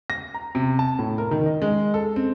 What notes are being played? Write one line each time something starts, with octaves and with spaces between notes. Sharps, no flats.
A#6
A#5
C3
A5
A2
A#4
D#3
D#5
G#3
A4
C4